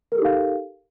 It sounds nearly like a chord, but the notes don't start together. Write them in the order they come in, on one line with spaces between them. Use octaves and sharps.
A#4 A4 G4 D#4 F5